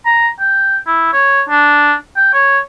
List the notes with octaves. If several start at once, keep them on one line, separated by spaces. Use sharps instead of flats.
A#5
G5
E4
C#5
D4
G5
C#5